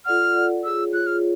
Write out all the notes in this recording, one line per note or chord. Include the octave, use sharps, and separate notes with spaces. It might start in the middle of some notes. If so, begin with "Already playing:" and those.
F4 A4 D5 F#5 F6
F4 A4 D5 F#5
F4 G#4 C#5 E6
F4 G#4 C#5 F#6
F6